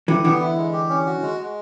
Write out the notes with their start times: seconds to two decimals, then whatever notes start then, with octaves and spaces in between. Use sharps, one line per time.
0.08 D3 E3 G4
0.24 D3 E3 B3
0.41 E4
0.57 G#3
0.73 G4
0.89 C#4
1.06 F#4
1.22 G#3
1.38 G#3